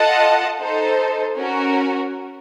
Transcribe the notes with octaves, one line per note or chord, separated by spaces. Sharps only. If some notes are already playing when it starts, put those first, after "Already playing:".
Already playing: F4 A4 D#5 F#5 A5
D#4 A4 C5
C#4 F#4 A#4